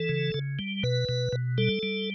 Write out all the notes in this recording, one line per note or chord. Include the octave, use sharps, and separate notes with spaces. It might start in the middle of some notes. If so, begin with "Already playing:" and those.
Already playing: E3 A4
C#3
C#3
G3
B2 B4
B2
B2
G3 A4
G3